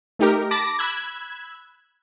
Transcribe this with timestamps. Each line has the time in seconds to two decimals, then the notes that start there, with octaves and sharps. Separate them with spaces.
0.19 A3 D#4 G4 A#4
0.51 A5 B5 D6 A6 A#6
0.79 B5 E6 F#6 G#6